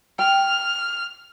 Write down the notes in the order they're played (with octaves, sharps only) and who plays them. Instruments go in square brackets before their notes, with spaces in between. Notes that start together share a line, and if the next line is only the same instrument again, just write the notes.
[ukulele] G5 [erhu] F6